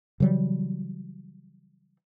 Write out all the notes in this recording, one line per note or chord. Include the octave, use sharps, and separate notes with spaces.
C#3 E3 F#3 G3